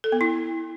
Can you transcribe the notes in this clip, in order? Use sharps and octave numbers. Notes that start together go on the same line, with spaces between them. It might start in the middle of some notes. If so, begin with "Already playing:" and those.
A4
B3
E4